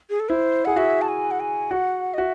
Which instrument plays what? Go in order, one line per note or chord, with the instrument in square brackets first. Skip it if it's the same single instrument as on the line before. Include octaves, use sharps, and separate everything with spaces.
[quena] G#4
A4
[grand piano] E4 [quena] C5
[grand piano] G#4 [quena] F#5
[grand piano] F#4 [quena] E5
[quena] A5
G#5
F#5
G#5
[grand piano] F#4 [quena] F#5
[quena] D#5
[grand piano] F#4 [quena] E5